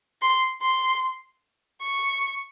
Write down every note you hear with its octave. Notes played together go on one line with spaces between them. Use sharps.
C6
C6
C#6